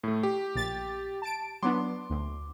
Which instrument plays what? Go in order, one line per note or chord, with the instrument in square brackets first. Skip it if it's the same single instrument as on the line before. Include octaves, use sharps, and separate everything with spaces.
[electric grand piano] A2 A3
G4
[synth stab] A#1 A6
A5 D7
[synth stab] F#3 B3 D4 [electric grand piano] C6 D6
[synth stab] D2